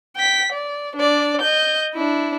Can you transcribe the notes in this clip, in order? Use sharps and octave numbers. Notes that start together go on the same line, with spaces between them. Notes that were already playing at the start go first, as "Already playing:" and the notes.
G5 B6
D5
D4 D5
D#5 G6
D4 E4